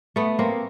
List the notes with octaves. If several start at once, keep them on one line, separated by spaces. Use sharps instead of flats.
A3 B3
A#3 C4